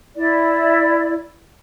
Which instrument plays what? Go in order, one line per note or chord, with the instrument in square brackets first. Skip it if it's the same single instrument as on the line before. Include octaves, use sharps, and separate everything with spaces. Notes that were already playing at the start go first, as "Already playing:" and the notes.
[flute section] E4 D5